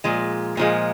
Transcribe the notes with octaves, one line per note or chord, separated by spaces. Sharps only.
A#2 F3 G#3
A#2 F3 G#3